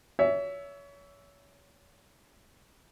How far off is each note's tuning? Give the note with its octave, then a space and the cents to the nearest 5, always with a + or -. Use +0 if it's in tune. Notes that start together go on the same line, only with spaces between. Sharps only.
C#5 +30 E5 +0